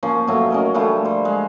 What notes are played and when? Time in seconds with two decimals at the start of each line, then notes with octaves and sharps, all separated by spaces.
0.03 F3 A#3 C#4
0.27 B2 F#3 A3
0.50 C#4 A#4 D#5
0.74 D3 F3 G3 A3
1.05 G3 C5
1.25 G#3